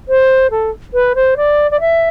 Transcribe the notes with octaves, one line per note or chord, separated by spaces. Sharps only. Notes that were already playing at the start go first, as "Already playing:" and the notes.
C5
A4
B4
C5
D5
D5
E5